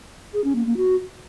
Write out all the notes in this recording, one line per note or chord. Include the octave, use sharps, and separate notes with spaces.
G#4
C#4
A#3
A#3
F#4